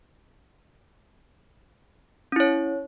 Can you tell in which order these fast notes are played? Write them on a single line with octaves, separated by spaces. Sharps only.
C#4 E4 C#5